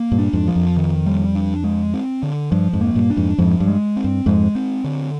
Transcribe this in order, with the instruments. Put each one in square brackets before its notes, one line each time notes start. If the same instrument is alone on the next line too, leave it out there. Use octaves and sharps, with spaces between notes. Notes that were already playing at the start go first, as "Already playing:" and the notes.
Already playing: [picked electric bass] A#3
[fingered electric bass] G2 A#2
[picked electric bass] D4
[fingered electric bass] F2 G#2
[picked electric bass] F3
[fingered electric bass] F2
[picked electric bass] D#3
G3
D4
G#3
C4
D3
[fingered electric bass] G2 [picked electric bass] F3
[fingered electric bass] F2 G#2
[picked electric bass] A#3
[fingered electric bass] G2 A#2
[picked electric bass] D4
[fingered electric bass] F2 G#2
[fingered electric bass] F2 G#2 [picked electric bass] F3
[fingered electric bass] G2
[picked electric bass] G#3
C4
[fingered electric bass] G2
[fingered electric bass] F2 G#2 [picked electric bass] G#3
[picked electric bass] C4
D3